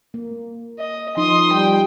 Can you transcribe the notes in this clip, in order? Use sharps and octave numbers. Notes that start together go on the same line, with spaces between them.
A#3
D#5
F3 D#4 C6 D#6
G3 G5